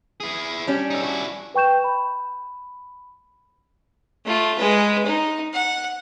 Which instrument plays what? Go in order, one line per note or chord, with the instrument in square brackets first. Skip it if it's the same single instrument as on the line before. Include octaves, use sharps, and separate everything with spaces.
[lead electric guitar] E4 G#4
[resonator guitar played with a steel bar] G3 C#4 D4
[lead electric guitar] D#4 A4
E4 F#4
[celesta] B4 G5 C#6 G6 E7
B5
[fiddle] A3 F4
G#3 B4
D#4
F#5